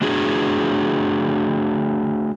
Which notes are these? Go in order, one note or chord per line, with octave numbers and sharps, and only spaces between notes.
A3 D4 F#4 G#4